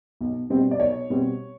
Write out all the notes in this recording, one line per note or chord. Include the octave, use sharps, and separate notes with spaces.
B1
B2 G3 C4
D5
B1 C#5
B2 G3 C4